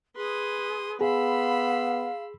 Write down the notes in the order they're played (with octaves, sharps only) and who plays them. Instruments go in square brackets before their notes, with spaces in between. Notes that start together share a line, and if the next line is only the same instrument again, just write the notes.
[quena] G#4 [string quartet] B4 C6 D#6
[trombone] B3 [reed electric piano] G#4 [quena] F5 [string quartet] B5 C6 E6